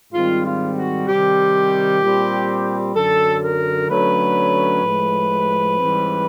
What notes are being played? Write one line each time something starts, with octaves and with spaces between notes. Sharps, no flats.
G#2 D#3 G3 C4 F4
F4
F#4
C3 D#3 G3 C4 G4
A#2 G3 C4
F#2 D3 F#3 A4
A#4
D3 F#3 A3 C#4 B4
A2 F3 G#3
G#2 E3 G3 C4